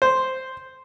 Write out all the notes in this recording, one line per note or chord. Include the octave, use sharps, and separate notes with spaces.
C5